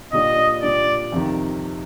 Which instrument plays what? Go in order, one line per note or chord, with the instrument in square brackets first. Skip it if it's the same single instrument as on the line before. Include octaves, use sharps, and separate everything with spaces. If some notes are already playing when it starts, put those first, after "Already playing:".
[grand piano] A#2 G3 D4 [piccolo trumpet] D#5
[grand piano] A#2 G3 D4 [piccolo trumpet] D5
[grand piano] F2 C3 D#3